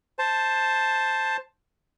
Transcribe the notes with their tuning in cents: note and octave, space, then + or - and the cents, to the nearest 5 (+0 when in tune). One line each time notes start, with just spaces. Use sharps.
C5 +5 A5 +0